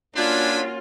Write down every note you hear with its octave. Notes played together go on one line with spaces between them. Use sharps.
A#3 C#4 D4 F4 F#4 A4 G#5 B5